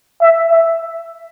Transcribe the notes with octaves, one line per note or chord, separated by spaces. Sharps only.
E5
E5